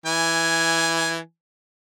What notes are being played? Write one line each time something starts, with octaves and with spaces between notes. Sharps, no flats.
E3 G#5